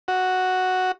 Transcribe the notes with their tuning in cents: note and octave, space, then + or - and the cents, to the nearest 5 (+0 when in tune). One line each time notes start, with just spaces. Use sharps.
F#4 +0